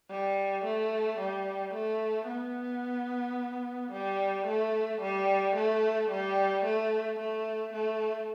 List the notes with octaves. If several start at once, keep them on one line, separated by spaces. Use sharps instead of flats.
G3
A3
G3
A3
B3
G3
A3
G3
A3
G3
A3
A3
A3